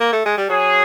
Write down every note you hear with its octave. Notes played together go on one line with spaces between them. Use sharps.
A#3
A3
G#3
G3
F#3 G#4